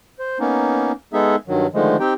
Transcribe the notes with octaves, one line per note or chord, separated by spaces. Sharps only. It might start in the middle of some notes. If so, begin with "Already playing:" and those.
C5
A#3 B3 C#4 D#4
G#3 B3 D#4 G#4 A4 E5
G2 D#3 F#3
D3 D#3 F3 G#3 A3
C4 D#4 G4 G5